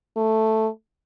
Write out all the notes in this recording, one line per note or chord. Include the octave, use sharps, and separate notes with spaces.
A3